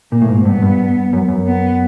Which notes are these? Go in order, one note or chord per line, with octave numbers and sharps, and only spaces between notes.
A#2 A#3
A2
G#2
G2 B3
G2
F#2
F#2
B3